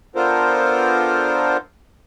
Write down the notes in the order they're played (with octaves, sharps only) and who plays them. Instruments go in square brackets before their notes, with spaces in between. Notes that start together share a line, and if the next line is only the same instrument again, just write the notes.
[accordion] B3 D4 F4 A4 A#4 C5